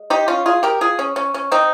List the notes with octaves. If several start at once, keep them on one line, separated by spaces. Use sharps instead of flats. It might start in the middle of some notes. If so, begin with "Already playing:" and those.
Already playing: G#3
D#4 G4
C#4 F4
F4 G#4
G4 A#4
F4 G#4
C#4
C#4
C#4
C4 D#4